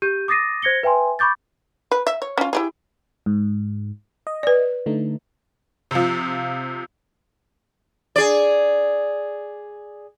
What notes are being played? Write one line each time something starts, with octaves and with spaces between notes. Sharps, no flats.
G4 G6 D#7
D6 D#6 A6 A#6 C7 D#7
C5 G#6 A#6 C#7 G7
B4 E5 G5 G#5 C6
B5 C#6 D6 G6 A6
B4
E5
C#5
C#4 F4
E4 G4 G#4
G#2
D#5
B4 D5
D3 A3 D#4
C3 F3
G#4 D5